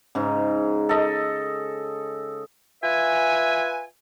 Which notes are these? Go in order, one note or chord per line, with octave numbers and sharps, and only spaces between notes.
G#2 C#3
A4 D#5
F4 B4 E5 G#5